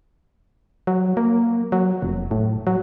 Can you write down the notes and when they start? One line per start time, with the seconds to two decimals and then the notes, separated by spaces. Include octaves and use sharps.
0.87 F#3
1.17 A#3
1.72 F#3
2.02 F1
2.31 A2
2.67 F#3